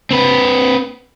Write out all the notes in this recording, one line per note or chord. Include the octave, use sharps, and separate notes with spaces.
C4 B4